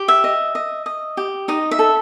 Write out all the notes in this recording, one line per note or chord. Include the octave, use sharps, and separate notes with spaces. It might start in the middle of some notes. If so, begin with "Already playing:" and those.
Already playing: G4
E5
D#5
D#5
D#5
G4
D#4 D#5
E5
A4